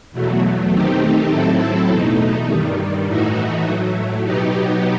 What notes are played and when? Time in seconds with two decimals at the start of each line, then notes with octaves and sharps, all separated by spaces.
0.11 E2 B2 F#3 A3
0.71 D#3 A3 C4 D#4 G4
1.29 A2 F#3 C4 E4 A4
1.88 E2 B2 A3 D#4
2.47 G2 D#3 G3
3.06 A2 E3 A3 D#4 F#4
3.65 A2 F#3 A3
4.24 B2 F#3 B3 D#4 G4